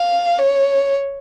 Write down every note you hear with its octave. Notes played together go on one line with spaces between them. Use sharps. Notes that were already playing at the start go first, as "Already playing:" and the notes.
Already playing: F5
C#5